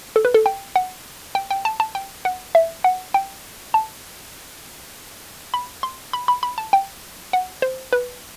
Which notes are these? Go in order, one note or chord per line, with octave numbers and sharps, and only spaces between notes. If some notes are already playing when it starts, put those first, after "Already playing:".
A4
B4
A4
G5
F#5
G5
G5
A5
A5
G5
F#5
E5
F#5
G5
A5
B5
C6
B5
B5
B5
A5
G5
F#5
C5
B4